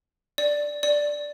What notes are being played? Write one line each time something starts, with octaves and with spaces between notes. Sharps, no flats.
D5
D5